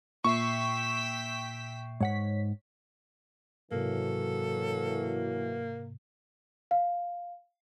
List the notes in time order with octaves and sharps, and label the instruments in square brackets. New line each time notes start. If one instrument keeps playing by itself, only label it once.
[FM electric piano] A#2 E5 C7 [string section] G5 E6 B6 [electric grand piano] C#6
[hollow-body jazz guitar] G#2 F#5 [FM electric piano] C#5 B6
[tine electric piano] G#2 C3 [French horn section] E3 F#3 [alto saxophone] A#3 [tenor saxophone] A4
[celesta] F5